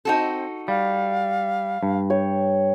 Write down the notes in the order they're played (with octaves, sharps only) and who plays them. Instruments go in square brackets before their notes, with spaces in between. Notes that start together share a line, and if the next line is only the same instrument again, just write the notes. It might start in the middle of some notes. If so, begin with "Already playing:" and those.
[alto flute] C4 [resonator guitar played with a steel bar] D#4 F#4 A4
[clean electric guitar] G3 [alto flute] F5
[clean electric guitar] G2
[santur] C#5 G5